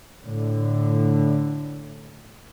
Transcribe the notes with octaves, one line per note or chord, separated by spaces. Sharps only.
A2 D3